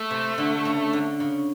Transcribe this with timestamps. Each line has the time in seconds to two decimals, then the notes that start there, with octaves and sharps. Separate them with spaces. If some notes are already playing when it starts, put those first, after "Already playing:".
Already playing: A3
0.11 C3
0.38 D3
0.65 C#3
0.93 D3
1.20 C#3